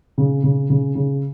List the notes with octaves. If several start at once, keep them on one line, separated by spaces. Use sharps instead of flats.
C#3
C#3
C#3
C#3